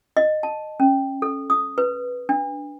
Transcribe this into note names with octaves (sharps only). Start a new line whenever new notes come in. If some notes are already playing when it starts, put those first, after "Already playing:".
D#5
A5
C#4
A4
D#6
B4
D4